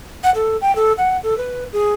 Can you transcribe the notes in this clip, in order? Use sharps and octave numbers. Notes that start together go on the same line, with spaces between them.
F#5
A4
G5
A4
F#5
A4
B4
G#4